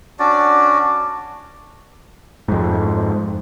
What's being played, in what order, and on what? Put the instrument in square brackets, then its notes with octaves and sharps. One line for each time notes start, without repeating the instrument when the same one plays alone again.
[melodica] C#4 D4 F#4 D5
[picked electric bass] F2 G#2